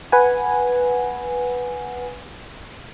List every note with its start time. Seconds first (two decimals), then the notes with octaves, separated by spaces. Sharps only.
0.12 B4 F#5 G#5